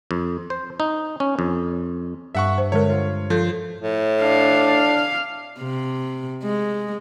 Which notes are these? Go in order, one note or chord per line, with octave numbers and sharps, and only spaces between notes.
F2
C5
D#4
C#4
F2
G2 E5 F#5 C#6
C5
D3 G#3 A#4 C#5
F4
F3 A4 C6 G6
A2
D4 F5
C3
G#3